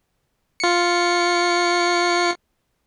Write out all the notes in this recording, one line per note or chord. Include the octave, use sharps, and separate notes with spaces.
F4 C#7